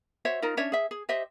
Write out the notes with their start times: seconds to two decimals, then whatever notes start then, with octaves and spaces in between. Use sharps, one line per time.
0.25 F#4 C5 C#5 E5
0.42 D#4 F4 A#4
0.57 C#4 D4 C#5 E5
0.72 G#4 E5
0.91 G#4
1.09 G4 C5 D#5 E5